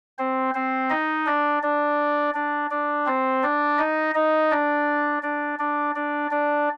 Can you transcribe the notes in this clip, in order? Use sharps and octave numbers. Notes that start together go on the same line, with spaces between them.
C4 C5
C4 C5
D#4 D#5
D4 D5
D4 D5
D4 D5
D4 D5
C4 C5
D4 D5
D#4 D#5
D#4 D#5
D4 D5
D4 D5
D4 D5
D4 D5
D4 D5